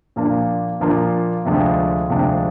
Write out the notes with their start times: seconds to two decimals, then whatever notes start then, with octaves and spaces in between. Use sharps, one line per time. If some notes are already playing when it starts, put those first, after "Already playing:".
0.16 A#2 F3 A#3 D4 F4
0.80 A#2 F3 A#3 D4 F4
1.45 D2 C3 F3 G#3 D4
2.10 D2 C3 F3 G#3 D4